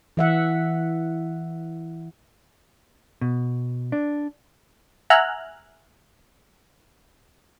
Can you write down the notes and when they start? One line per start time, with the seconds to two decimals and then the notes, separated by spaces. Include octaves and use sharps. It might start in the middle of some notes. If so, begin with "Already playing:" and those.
0.17 E3 E5 F#5
3.21 B2
3.92 D4
5.10 E5 F#5 G#5 A#5 F6 F#6